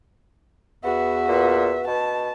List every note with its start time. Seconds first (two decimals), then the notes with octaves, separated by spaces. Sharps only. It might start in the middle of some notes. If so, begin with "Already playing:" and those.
0.84 E2 B3 F#4 E5
1.29 A#2 B4
1.87 B2 A5